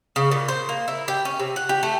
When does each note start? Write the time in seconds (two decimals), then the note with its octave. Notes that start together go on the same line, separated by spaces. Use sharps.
0.16 C#3
0.31 A#2
0.48 C5
0.69 A#3
0.88 E4
1.08 G4
1.25 C#4
1.39 C3
1.56 F#5
1.69 G4
1.83 A3